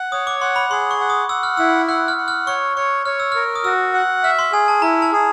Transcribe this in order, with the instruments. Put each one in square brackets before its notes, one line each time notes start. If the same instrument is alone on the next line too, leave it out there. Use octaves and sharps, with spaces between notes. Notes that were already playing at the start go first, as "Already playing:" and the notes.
Already playing: [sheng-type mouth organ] F#5
[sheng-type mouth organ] C#5 [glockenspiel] D#6
[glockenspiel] D6
[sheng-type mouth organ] F#5 [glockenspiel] C6
[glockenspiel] B5
[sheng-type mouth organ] G#4 [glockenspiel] C6
[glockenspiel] C#6
[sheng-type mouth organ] F#5
[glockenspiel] D#6
[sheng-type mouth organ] F#5 [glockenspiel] E6
[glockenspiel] F6
[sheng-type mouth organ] E4 [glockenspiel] E6
[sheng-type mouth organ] F#5 [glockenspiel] F#6
[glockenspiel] F6
[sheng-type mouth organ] F#5
[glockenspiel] F6
[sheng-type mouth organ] C#5 [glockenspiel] C#6
[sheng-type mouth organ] C#5 [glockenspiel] C#6
[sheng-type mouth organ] C#5 [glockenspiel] F6
[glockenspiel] E6
[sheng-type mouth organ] A#4 [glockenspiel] F6
[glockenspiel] D#6
[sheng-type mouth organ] F#4 [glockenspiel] E6
[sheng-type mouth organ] F#5
[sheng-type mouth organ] E5 [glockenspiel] F6
[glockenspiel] C6
[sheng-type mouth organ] G#4 [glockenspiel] G#5
[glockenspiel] A5
[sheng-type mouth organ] E4 [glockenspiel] A#5
[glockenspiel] A5
[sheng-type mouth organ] G#4